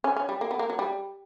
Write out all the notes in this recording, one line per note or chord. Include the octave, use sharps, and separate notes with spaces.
C#4
C#4
G3
A#3
B3
A#3
F#3
G3